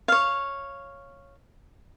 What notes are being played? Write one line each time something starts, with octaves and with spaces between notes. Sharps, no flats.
C#5 F5